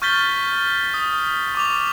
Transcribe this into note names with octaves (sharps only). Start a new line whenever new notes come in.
C#6 F6 G6 A6 B6 G7
D#6
C#6 D6 F7